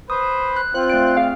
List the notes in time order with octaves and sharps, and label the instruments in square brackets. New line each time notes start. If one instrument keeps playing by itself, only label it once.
[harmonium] B4 C5 [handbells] D#6
[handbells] F#6
[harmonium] C4 F4 [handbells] C5 [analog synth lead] F#6
[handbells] A3 D5 D7
[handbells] C4 G#4 [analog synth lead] F5